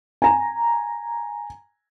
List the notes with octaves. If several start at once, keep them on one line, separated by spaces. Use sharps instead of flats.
G#5 A#5